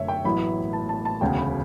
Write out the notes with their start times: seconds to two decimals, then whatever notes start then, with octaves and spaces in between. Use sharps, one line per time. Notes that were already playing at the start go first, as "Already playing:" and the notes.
Already playing: F#1 F#2 D3 A3 C#5 E5
0.08 G5
0.25 A1 A2 F#3 B3 E4 B5
0.73 A5
0.89 A5
1.05 A5
1.21 E1 D2 C#3 G5
1.37 B5